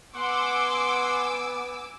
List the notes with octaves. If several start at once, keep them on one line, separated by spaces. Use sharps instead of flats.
B3 F#5 G#5 C6 D6 E6